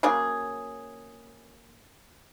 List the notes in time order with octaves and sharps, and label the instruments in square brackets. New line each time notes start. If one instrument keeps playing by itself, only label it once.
[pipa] C#3 F#3 A#3 G#4